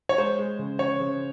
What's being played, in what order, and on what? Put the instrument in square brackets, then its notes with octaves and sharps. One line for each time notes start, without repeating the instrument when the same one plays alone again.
[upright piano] C#5
G#3 C5
G#3
C#3
C#3 C#5
C#3